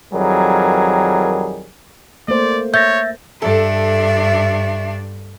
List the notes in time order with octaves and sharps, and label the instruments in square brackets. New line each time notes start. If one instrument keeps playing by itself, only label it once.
[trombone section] F2 D#3 F#3 G3 G#4 A#4
[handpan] A3 A#3 C5 [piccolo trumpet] D5
[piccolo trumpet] C#5 [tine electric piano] E5 A6 A#6 [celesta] G6
[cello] G2 D4 [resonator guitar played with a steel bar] A4 [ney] E5